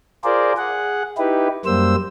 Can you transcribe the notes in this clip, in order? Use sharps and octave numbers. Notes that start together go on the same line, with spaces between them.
F4 G#4 A#4 C5 D5
G#4 F#5
D#4 E4 G4 B4
F#2 G3 A#3 C5 E6